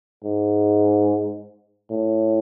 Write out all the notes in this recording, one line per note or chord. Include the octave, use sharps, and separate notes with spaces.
G#2
A2